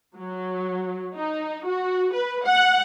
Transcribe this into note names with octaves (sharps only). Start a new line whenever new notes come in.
F#3
D#4
F#4
B4
F#5